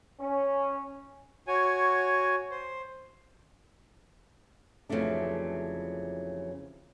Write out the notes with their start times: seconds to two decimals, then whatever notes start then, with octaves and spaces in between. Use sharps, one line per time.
0.20 C#4
1.47 F#4 C#5 G#5
2.51 C5
4.89 F2 C#3 E3 F#3 A3 D4